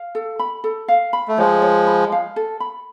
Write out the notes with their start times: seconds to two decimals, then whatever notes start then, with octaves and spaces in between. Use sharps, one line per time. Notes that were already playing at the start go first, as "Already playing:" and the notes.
Already playing: F5
0.15 A4
0.39 B5
0.64 A4
0.88 F5
1.13 B5
1.28 A3
1.38 F3 G#3 C#5
1.62 C#5
1.87 B5
2.12 F5
2.36 A4
2.60 B5